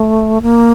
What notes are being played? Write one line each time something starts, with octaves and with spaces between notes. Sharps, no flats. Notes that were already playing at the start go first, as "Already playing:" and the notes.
Already playing: A3
A#3